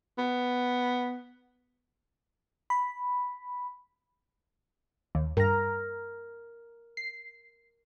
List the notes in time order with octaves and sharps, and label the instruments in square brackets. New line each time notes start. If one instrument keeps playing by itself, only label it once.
[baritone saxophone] B3
[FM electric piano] B5
[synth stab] D#2
[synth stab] G2 A#5 [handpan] A#4
[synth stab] C7